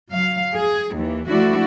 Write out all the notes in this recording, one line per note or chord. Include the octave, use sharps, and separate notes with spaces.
F#3 F5
G#4
D#2 E3
F3 A3 D4 E4 F#4